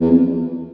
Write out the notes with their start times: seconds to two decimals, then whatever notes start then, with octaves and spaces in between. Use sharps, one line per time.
0.01 E2
0.10 F2